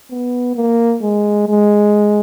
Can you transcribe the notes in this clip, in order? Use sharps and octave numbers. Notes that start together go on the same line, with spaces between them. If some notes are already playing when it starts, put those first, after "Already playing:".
B3
A#3
G#3
G#3